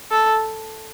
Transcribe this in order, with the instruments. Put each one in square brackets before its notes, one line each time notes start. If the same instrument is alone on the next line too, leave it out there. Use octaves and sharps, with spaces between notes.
[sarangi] A4